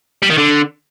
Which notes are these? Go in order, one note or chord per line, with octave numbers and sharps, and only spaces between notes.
G3
D#3
D3